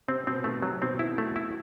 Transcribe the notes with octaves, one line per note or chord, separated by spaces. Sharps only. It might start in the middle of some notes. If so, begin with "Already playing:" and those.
C3 C4
B2 C4
B2 D#3 A3
C3 F#3
B2 D#3 C4
E4
A3
E4